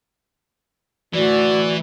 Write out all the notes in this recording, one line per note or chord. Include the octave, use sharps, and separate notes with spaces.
D2 A2 E3 F#4 D5